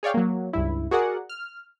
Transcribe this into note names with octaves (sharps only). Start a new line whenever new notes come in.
G#4 C#5 D5 F5 G5
F#3 A#3
C#2 G2 E4
F#4 G#4 A#4 D5 F#5
F6